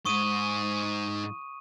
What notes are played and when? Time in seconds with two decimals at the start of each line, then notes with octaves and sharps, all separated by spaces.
0.05 G#2 C#6 D#6 D#7